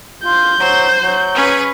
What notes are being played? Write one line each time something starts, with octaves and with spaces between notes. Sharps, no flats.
F4 G6
F#3 C5
F#3
C#4 G#4 B4